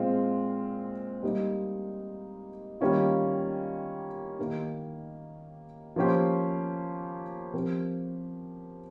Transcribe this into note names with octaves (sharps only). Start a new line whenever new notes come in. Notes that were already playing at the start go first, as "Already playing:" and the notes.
Already playing: A#2 G#3 C4 F4
G3 A#3 D#4
D#3 G3 A#3 C#4 F4
D#3 A#3 D#4 G4
F3 A#3 C#4 G4 C5
F3 C4 G4 A#4